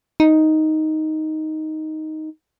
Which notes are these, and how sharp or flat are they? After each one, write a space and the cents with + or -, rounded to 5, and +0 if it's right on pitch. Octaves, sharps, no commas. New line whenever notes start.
D#4 +5